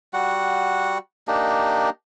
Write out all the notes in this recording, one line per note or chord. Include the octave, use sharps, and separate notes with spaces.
G3 F#4 F#5
A#3 D4 D#4 G4